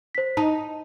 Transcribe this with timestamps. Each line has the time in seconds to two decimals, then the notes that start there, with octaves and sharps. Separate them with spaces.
0.15 C5 B6
0.37 D#4 A5